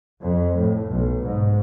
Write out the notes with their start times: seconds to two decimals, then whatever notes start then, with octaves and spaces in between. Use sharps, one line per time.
0.20 F2
0.58 A2
0.90 B1
1.25 G#2